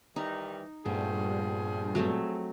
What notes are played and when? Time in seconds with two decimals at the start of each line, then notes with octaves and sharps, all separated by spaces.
0.16 D#3 E3 G3 D#4
0.86 G2 A#2 F3 G3 A3 B3 G#4
1.95 F#3 A3 C4